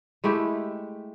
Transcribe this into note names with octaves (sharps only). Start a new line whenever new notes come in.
G#3 A3 E4 G4